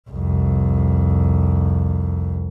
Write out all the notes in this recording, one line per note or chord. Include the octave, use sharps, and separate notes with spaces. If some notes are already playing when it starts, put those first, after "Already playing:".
C2 F2